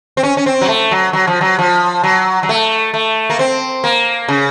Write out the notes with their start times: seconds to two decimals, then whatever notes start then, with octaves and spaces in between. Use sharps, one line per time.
0.17 C4
0.23 C#4
0.37 C#4
0.46 C4
0.61 F#3
0.68 A3
0.91 F#3
1.13 F#3
1.27 F3
1.41 F#3
1.59 F3
2.03 F#3
2.43 F#3
2.49 A3
2.94 A3
3.30 A#3
3.39 C4
3.84 A#3
4.28 C#3